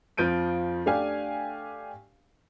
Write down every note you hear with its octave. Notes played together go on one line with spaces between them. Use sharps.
F2 F3 G6 D7 D#7
A3 D4 G4 F5 G#5